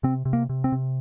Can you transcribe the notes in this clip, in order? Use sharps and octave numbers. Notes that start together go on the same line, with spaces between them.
C3 C4
C3
A#3
C3
C4
C3